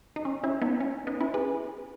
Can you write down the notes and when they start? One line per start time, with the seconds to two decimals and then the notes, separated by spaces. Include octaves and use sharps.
0.16 D#4
0.25 C#4
0.43 C#4 E4
0.62 B3 D#4
0.80 C#4
1.07 B3 D#4
1.21 C#4 E4
1.34 G#4 B4